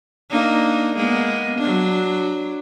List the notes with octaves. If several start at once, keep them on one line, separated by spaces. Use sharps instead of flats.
A#3 D4 D#4
G#3 A#3 B3
F#3 D4